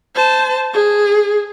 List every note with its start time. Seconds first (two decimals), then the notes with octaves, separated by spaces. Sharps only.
0.15 C5 A5
0.74 G#4